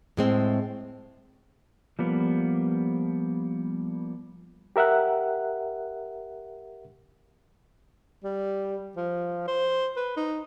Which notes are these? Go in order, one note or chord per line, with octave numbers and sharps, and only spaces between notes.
A2 G#3 C4
F3 G3 A#3 B3
G4 A#4 E5 F#5 F#6
G3
F3
C5
B4
D#4